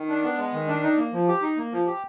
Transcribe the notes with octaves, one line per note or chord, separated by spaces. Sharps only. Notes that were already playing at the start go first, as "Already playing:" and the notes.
Already playing: D#3
D4
B3
G#3
D#3
D4
D#4
A#3
F3
G4
D#4
A#3
F3
G4